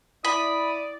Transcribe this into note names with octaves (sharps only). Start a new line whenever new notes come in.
E4 D5 B5 D#6